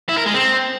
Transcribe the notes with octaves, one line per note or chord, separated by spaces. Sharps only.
E4
A#4
G#3
C4